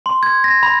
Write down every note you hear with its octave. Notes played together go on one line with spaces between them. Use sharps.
C6
G#6
A#6
B5